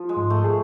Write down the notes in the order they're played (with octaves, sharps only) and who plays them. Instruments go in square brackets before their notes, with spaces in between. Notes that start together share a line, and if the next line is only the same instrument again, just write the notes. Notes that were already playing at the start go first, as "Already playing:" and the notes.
Already playing: [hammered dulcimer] F3
G#3
[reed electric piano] G#2
[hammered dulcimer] A3
[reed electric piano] G#4